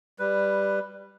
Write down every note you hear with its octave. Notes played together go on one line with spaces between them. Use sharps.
G3 B4